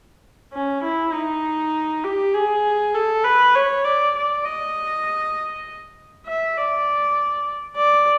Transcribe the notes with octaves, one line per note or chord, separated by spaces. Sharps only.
C#4
E4
D#4
G4
G#4
A4
B4
C#5
D5
D5
D#5
E5
D5
D5